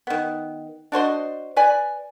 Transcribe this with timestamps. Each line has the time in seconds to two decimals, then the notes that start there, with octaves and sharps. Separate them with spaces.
0.07 D#3 B3
0.92 D4 F#4 C5 D#5
1.56 B4 D5 G#5